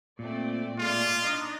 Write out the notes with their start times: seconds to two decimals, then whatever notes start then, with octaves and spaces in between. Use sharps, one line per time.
0.19 A#2 A3 C4 D5
0.79 G#3 A3 F4 D5
1.22 D4 D#4 D#5